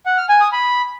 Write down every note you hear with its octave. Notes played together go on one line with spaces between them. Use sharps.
F#5
F6
G#5
D#6
B5